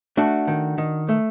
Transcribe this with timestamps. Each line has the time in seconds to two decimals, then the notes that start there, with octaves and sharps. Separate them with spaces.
0.17 A3 D4 F#4
0.47 D#3
0.78 D#3
1.09 A3